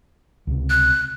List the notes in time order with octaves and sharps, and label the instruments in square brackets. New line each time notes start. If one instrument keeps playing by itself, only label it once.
[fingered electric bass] C#2 C3
[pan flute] F#6